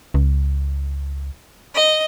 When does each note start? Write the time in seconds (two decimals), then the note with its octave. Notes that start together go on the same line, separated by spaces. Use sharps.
0.14 C#2
1.75 D#5